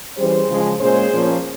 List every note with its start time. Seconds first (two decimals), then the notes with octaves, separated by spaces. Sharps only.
0.18 E3 G3 C#4 G#4 C5
0.49 C#3 F3 G#3 C#4
0.80 A#2 G#3 C#4 G#4 C5
1.12 A#2 F3 A#3 C#4